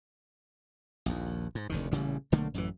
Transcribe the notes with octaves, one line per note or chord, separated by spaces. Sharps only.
A#1 D#2
G#2
F1 D2 D#3
A1 A#2 C#3 G3
B1 D3 A3 A#3
A1 F#2 C3 E3